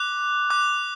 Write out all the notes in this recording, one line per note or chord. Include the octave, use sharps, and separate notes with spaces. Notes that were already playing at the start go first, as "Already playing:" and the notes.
Already playing: D6 F#6
D6 F#6